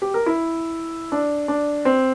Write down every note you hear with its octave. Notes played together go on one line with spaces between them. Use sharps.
G4
A#4
E4
D4
D4
C4